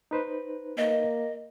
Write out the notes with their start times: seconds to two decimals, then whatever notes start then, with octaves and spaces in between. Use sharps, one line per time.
0.11 D#4 B4 C5
0.78 A#3 D#5